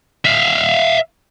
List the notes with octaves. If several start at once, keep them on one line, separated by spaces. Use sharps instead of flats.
E5 F5